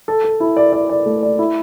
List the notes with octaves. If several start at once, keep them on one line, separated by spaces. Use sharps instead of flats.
A4
A4
E4
D5
D5
D5
A3
D5
E4